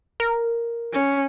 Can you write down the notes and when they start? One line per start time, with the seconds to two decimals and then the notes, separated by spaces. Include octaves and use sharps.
0.20 A#4
0.93 C#4